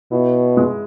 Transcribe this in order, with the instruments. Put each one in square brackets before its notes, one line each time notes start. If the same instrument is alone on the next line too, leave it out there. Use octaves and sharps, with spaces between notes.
[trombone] B2 [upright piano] E4
[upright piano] G#3